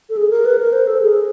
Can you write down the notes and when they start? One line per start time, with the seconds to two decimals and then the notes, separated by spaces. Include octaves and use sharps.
0.10 A4
0.17 G#4
0.30 A#4
0.45 B4
0.59 A#4
0.73 C5
0.87 A4
1.02 G#4